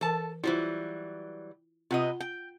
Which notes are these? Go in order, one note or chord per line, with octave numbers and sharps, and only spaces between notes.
E3 A4 A#4 A5
E3 F#3 G3 E4 F4 C5
C3 F4 B4 D#5 F#5
G5